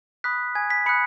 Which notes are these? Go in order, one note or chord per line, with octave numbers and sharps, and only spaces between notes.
B5 D#6 F#6 B6
G#5 D#6 F#6 G#6
B6
B5 D#6 F#6 C#7